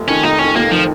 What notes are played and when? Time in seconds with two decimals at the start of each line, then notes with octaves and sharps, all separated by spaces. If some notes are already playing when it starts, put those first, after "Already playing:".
Already playing: F1
0.08 F2 D#3 C#4
0.23 F1 D#4
0.39 F2 D#3 C#4
0.56 F1 A#3
0.71 D#3 F3